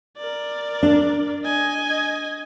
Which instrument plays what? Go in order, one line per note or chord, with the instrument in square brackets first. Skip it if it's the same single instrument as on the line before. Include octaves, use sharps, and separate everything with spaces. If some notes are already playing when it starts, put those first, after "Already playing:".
[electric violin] A#4 D5
[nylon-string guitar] D4
[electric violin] D#5 G#5